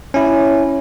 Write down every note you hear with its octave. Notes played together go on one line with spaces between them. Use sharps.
C#4 E4